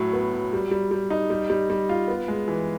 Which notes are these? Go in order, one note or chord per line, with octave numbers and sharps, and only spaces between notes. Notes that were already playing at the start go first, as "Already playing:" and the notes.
Already playing: A2 F#3
B3
F#3
G3
G3
G3
D#4
G3
G3
G3
F4
B3
G#3
E3